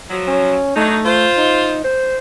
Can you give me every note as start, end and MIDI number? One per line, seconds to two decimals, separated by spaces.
0.10 0.57 53
0.10 0.57 54
0.27 0.76 61
0.76 0.98 54
0.76 1.27 57
0.76 0.98 62
0.76 0.98 63
1.05 1.82 65
1.05 1.82 72
1.37 1.83 63
1.84 2.18 72